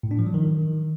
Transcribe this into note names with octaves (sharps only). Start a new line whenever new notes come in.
A2
D4
F3
F#3
D#3